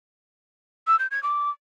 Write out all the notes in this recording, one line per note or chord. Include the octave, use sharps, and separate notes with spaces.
E6
G6
G#6
D6